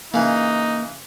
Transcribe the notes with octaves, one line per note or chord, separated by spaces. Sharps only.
C#3 E3 A#3 D#4